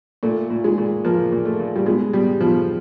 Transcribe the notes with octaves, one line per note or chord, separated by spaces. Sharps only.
A#2 A3
A#2
G#3
A#2
F3 A#3
A#2
A3
A#2
G3
B2 G#3
B2 G3
B2 F3